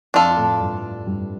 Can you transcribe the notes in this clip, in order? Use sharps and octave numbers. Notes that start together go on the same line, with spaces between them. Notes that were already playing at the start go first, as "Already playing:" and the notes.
F2 F3 D4 F4 A4
A2 A3
G2 G3
G2 G3